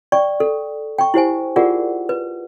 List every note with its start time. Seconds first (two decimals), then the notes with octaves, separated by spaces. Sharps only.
0.12 D5 G5 C#6
0.40 A4
0.98 G5 C#6
1.14 E4 G4 C5 G#5
1.56 F4 G4 G#4 A#4 D5 F#5
2.09 B4